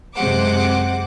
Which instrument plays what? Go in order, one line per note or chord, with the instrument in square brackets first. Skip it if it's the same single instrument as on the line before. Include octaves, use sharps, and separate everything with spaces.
[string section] F#2 C3 G#3 C5 F#5 D6